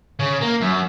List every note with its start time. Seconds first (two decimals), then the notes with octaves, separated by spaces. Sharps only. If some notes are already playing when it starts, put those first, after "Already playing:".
0.20 C#3
0.42 A#3
0.61 F#2